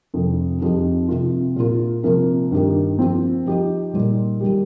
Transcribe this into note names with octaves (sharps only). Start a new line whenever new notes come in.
F2 C3 F3
F2 F3 D#4 G4
C3 F3 A#3 F4
A#2 A#3 F4
C3 F3 A#3
G2 D#3 A#3 G4
F3 C4 F4
F3 D#4 G4
A#2 G3 D#4
D#3 G3 A#3 G4